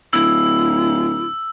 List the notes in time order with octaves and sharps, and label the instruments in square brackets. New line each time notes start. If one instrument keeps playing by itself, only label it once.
[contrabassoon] D1 [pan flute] E4 [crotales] E6